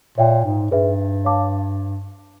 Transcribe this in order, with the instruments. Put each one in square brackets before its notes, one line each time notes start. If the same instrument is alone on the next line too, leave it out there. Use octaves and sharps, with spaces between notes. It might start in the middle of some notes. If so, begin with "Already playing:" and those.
[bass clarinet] A#2 [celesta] C#5 E5 G5
[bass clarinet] G#2
[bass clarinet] G2 [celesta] G#4 B4 E5
[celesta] C#5 F5 A5 D6